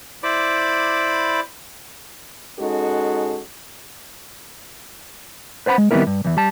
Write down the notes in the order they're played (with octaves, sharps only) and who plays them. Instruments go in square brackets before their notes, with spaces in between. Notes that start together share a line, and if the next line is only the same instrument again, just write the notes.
[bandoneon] E4 C5 D5 B5 D6
[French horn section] G#3 C#4 D#4 F#4 A4
[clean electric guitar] B4 C5 F#5 A#5 B5
G#3
D#3 G3 B3 C4 E4 A#4
G2
E2 E3
G3 A5